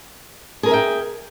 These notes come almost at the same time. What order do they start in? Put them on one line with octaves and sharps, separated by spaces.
G#4 A#4 G#5 E5 G5